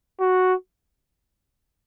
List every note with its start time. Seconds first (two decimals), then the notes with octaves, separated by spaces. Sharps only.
0.20 F#4